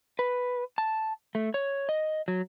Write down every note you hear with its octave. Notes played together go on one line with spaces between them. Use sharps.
B4
A5
A3
C#5
D#5
F#3